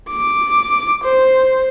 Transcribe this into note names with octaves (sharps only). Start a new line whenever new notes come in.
D6
C5